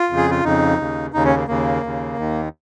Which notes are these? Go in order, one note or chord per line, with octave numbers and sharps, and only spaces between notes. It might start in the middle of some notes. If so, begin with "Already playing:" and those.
Already playing: F4
F2 C#3
G#4
F4
F2 C#3 D#4
D#2 C#3
D#2 C#3 D#4
C#4
A#3
D#2 C#3 A#3
D#2 C#3
D#2 D#3